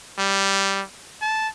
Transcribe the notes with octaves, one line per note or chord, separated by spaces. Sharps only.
G3
A5